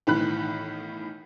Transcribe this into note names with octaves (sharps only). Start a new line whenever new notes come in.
B1 A2 D#3 E3 B5 F#6